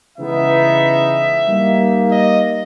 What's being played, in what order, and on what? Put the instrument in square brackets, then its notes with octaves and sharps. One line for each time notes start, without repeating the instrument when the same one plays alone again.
[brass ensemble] C#3 E3 G#3 B3 D#4 E5
G3 A#3 D#4
D#5